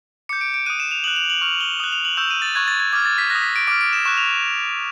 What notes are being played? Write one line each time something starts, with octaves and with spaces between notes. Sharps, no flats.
D6 G6 C#7
D7
D7
D#6 F#6 D#7
E7
F7
D#6 F#6 F#7
F7
F#7
C#6 F6 F7
G7
D#6 F#6
F7
F#7
C#6 E6 G6 E7
D#7
A6
C#6 F#6 G#6
A6
G#6
D6 F6 G#6
A6
B6
D#6 F#6 A#6
B6
D7
D6 F6 D7
D7
E7
C#6 F#6 E7
F7